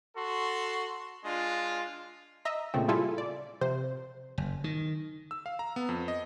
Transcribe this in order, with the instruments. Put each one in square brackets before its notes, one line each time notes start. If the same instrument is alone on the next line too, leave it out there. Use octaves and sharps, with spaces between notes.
[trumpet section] F#4 A4 C6
G#3 D4 F4
[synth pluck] D#5 E5 A#5
A#2 C#3 A3 C4
G3 E4 F4 G#4 A4 E5
D5
C3 F3 C5
[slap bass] F#1
D#3
[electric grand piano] E6
F5
A#5
B3
F2
D#5